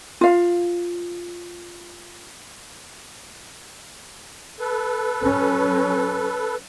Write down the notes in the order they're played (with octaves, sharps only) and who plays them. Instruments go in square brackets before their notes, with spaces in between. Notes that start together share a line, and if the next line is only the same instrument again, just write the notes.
[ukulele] F4 F5
[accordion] A4 B4
[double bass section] F#3 C#4